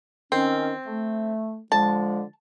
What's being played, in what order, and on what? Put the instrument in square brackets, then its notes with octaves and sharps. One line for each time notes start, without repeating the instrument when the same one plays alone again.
[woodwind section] D#3 C#4 [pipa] C4
[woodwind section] A3
[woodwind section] D3 F3 G#3 [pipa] A5